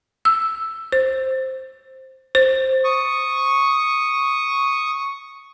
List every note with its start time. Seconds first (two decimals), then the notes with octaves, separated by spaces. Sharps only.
0.25 E6
0.92 C5
2.35 C5
2.84 C#6 D#6